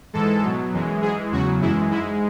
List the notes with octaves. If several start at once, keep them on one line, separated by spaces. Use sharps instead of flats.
G#2 E3 G#3 A4
B2 F#3
F#2 E3 G#3
G#2 E3 G#3 G#4
E2 C#3 F#3 F#4
F#2 E3 G#3 E4
G#2 G#3 E4